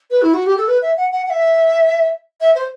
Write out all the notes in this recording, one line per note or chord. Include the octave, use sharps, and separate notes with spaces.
B4
E4
F#4
G4
A4
B4
E5
F#5
F#5
F#5
E5
E5
C5